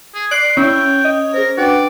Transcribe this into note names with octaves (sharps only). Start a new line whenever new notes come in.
G#4
D5 C6 F#6 D7 F#7
C#4 E4 G5
D#5
G#4 A#4 C5
D4 F#4 B4 D5 G5